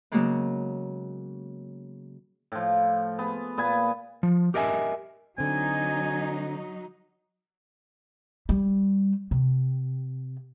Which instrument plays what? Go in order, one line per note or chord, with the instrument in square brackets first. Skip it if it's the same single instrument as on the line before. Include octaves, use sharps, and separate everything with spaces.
[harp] C#3 F#3 G#3 A#3 B3
[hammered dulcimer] A2 F3
B3 G#4
A#2 B3 B4 G#5
[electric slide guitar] F3
G4 A#4 D#5 E5 G#5
[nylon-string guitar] D3 C4 [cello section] F#3 D#4 [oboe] G#5
[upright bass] G3
C3